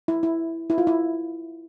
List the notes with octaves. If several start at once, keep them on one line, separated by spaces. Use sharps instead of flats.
E4
E4
E4
F4
E4